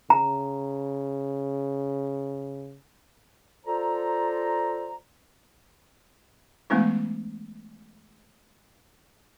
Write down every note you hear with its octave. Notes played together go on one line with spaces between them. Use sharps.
C#3 A#5
F4 A4 C5 D5 A#5
E3 G#3 A3 B3 C#4 E4